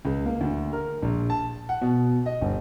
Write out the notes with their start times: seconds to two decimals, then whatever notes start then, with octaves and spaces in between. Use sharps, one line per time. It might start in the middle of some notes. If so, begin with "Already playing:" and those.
0.05 C#2
0.26 A#3
0.41 D2
0.73 A#4
1.02 A#1
1.30 A5
1.69 F#5
1.81 B2
2.26 D#5
2.41 G1